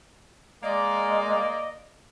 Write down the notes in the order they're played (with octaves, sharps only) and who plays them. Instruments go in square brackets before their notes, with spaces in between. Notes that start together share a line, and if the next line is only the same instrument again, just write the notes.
[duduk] G#3 [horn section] A#3 D5 [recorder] D#5